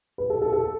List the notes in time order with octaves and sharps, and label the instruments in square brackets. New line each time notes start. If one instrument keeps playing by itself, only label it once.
[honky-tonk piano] B4
A4
A4
A4